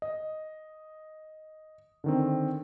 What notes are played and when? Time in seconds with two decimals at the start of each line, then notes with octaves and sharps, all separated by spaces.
0.02 D#5
2.04 D3 D#3 C4